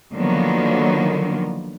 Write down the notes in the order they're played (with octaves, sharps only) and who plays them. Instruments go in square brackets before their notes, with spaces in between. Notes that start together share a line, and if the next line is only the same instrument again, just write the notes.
[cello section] D3 D#3 F3 F#3 A#3 B3